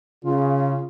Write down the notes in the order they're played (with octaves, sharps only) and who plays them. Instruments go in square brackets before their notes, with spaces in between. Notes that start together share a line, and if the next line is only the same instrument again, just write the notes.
[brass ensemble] C#3 [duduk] F4